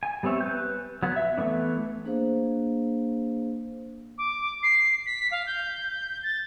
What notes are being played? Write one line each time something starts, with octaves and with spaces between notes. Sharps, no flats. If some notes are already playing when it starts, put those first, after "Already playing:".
G#5
G3 B3 C4 C#5 E5
B4 G6
F#3 B3
E5
E3 A3 B3 D4
A#3 D4 G#4 C5 F5
D6
C7
B6
F5
G6
A6